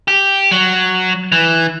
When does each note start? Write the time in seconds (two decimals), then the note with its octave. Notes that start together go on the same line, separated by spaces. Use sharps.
0.08 G4
0.51 F#3
1.32 E3